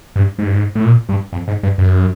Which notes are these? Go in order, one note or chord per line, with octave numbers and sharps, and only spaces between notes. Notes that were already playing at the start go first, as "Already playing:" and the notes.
G2
G#2
G2
G#2
A2
A#2
G2
F2
G#2
G2
F#2